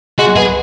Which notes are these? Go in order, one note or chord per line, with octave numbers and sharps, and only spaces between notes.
G#3 F#4
B3 G#4